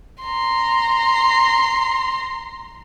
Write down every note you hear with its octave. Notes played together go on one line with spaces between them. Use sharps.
A#5 C6